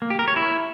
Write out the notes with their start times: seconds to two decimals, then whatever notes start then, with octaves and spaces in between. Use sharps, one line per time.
0.02 A#3
0.10 G4
0.19 A#4
0.28 C#5
0.36 E4